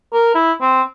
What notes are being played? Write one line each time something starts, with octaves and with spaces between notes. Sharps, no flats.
A#4
E4
C4